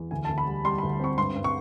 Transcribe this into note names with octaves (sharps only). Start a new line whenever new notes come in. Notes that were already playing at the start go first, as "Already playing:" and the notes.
Already playing: E2
D2 G#5
A5
D2
B5
G3
G3 C6
B5
D2
C4 C#6
G2 C6
G2
C#6